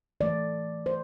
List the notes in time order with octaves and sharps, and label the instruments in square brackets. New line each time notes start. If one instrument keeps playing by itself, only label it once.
[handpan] E3 A3 D5
C5